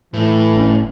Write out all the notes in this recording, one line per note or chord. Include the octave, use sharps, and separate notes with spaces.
A2 E3
F#1 C#4